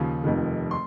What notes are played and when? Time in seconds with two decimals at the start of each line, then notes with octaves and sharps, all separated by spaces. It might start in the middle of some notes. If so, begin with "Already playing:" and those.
Already playing: D#2 C#3 F3
0.24 F1 F2 D#3
0.71 C6